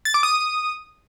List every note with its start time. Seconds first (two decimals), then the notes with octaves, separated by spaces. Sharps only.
0.05 A6
0.14 D6
0.23 D#6